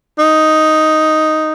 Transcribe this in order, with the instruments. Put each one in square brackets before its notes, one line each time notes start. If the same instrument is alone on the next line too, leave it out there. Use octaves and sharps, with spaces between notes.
[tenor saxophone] D#4